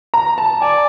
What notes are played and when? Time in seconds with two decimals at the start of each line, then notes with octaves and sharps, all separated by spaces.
0.14 A#5
0.38 A5
0.62 D5 G#5